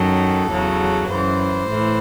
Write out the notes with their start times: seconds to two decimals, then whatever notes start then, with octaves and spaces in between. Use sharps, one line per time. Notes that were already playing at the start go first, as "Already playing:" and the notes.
Already playing: F#2 D#3 F#3 A4
0.51 E2 C#3 F#3
1.09 F#2 E3 C5
1.68 A2 E3